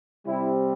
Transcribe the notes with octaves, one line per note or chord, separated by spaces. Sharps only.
C3 G3 C4 E4